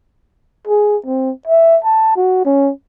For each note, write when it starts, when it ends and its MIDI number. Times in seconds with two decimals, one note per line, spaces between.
0.67 0.97 68
1.06 1.31 60
1.48 1.78 76
1.84 2.13 81
2.16 2.42 66
2.45 2.71 61